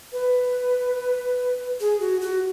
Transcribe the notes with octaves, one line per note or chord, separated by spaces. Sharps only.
B4
G#4
F#4
F#4